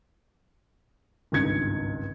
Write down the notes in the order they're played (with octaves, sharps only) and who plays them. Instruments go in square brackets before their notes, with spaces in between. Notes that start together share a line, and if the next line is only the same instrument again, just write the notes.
[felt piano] G#1 C#2 G2 G#6 C#7